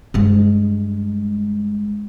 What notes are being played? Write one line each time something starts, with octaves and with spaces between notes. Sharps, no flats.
G2 G#3